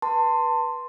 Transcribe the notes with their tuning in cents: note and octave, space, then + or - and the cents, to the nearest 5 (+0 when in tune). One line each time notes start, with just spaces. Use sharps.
B4 -20 A5 +25 C6 +0